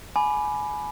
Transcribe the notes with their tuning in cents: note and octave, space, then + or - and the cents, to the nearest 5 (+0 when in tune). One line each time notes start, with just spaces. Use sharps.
G#5 +20 B5 +0 D6 +10